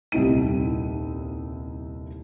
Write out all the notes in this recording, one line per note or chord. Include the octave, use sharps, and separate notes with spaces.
D#1 C2 C4 D#4 E4 D#7